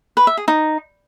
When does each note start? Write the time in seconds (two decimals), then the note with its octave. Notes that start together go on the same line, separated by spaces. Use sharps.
0.17 B4
0.27 E5
0.37 G#4
0.48 D#4